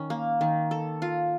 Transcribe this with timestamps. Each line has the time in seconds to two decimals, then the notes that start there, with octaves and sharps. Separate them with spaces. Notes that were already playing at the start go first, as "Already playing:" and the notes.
Already playing: D#3 C#4
0.10 A#3
0.41 D#3
0.71 A4
1.02 F4